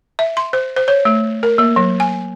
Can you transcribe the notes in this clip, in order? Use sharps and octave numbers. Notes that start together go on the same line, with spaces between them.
E5
C6
C5
C5
C#5
A3
A#4
A#3
F#3
G#5